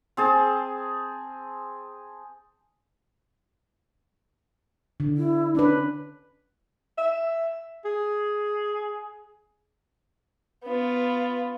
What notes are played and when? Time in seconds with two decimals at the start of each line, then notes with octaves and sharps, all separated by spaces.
0.17 C4 G#4 A5
5.00 D3
5.17 E4
5.55 C#4 D4 B4
6.98 E5
7.85 G#4
10.64 B3 F4